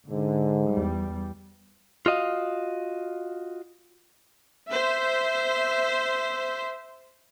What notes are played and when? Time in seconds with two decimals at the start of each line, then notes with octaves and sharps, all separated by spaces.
0.10 G#2 D3
0.70 E2 G3
2.06 F4 F#4 D#5 F5
4.69 C5 E5